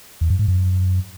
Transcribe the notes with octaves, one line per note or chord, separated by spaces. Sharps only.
E2
F#2
G#2
F#2